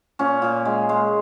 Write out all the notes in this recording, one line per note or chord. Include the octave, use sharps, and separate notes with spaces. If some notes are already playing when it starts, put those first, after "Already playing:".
A#2 C#4
A#2
G#3
G#3